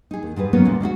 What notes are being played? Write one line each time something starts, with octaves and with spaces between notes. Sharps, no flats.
D#4 G#4
D#2
G#2 G3 G#4 B4
F#3 A#3 B3 C#4 D#4 C#5
D2 A#2 G3
G#3 C#4 E4 F#4